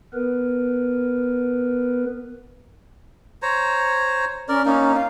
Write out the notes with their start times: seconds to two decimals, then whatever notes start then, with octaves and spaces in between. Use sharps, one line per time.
0.14 B3 A#4 B4
3.42 C5 C#5 A#5
4.48 C#4 A#4 D5
4.65 A#3 C#4 D#4
4.95 F5